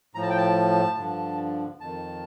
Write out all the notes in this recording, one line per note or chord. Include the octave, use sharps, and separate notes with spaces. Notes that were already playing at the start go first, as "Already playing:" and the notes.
A2 F3 A#5
A5
G5
A5
G2 D3 F3
F2 D#3 A5